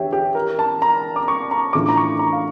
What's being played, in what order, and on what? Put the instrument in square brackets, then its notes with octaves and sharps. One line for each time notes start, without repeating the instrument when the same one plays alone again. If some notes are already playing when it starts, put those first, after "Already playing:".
Already playing: [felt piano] E2 D3 [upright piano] G4 C#5 E5
[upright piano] G4
A#4
A5
A#5
D6
C#6
A#5
[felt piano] A2 E3 A3 D4 F4 [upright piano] D6
[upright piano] A#5
C#6
A#5
F5